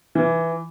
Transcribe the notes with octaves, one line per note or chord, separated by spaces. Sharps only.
E3